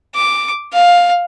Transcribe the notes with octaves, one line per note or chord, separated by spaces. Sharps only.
D6
F5